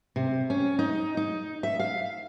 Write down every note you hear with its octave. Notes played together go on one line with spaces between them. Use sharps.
C3
C#4
D#4
D#4
E5
F5